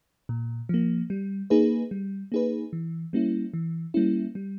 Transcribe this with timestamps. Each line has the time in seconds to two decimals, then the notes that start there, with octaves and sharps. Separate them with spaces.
0.29 A#2
0.69 F3 A#3
1.10 G3
1.50 A#3 D#4 G#4 B4
1.91 G3
2.32 A#3 D#4 G#4 B4
2.73 E3
3.13 G3 A#3 C#4 E4
3.54 E3
3.94 G3 A#3 C#4 E4
4.35 G3